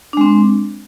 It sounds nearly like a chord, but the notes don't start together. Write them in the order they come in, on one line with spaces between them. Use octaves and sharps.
D4 G#3 C4